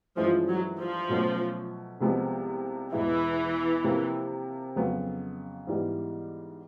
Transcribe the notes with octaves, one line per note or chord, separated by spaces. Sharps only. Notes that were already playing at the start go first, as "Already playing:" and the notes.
G2 E3 F3 G#3 C#4 E4
F#3
F3
B2 F#3 A3 C#4
C2 C3 F3 G#3 B3
E2 B2 E3 G#3 B3 E4
C3 F3 A#3
F2 C#3 F#3 B3
G#2 E3 G3 B3